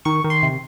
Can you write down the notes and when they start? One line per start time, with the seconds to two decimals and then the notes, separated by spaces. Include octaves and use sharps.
0.05 D#3 C#6
0.24 D#3
0.30 C6
0.43 C3